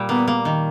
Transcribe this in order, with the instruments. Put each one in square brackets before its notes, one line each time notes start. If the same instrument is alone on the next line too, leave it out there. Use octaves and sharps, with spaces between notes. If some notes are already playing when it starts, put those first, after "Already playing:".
Already playing: [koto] A#2 G3
[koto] A#3 [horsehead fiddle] B3
[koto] A#3
D#3